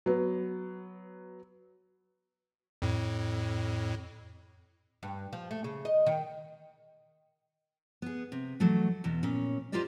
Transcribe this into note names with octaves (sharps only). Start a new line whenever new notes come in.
F#3 B3
F2 A2
G2
F3
A3
C#3
D#5
D#3
B3 G#4
C3
E3 F#3 A3
E2 B2
A#2 C#4
F4 G4 A#4 C5 D5 D#5